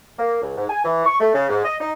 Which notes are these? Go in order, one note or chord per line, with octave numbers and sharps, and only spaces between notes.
A#3
C#2
G#2
G#5
E3
C#6
A3
C#3
G#2
D#5
D#4